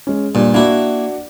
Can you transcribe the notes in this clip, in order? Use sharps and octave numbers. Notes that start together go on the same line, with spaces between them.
G#3 C#4
G2 A#2
A#3 D4 E4 F#4